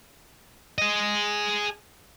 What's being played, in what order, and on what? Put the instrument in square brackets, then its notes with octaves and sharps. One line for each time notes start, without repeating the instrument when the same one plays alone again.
[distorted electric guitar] G#4 D#5